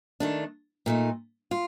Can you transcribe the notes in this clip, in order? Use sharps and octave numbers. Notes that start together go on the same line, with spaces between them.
D#3 A3 D4
A#2 A3 D#4
F4